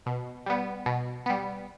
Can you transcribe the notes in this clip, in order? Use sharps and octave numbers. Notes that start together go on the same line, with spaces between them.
B2
G3 B3
B2
G3 B3